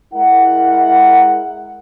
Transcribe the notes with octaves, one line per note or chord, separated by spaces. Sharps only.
G#3 E4 A#4 F#5